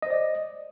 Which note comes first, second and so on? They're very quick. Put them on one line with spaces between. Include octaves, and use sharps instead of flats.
D#5 C5 D5